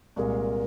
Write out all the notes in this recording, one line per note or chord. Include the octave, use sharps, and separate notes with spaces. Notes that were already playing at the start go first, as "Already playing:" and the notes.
C2 A#2 G#3 A#4